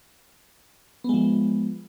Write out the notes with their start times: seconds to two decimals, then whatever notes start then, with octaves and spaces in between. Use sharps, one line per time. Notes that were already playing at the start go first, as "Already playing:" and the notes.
1.04 B3
1.09 G#3
1.14 F3